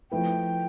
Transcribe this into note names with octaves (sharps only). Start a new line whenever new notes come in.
F3 A3 E4 B4 G5